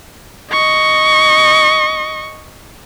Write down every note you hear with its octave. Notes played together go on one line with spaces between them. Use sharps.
D#5 C#6